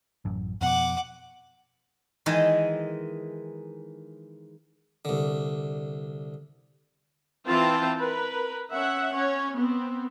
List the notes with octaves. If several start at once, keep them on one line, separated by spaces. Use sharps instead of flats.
A1 F#2
F2 B2 F#5 D6
D#3 E3 G#3 D#4 G#4 D#5
C2 D3
E3 C4 F4 C5 G5 A5
A#4 B4
C#4 E5 F#5
C#4 C#5
B3 C4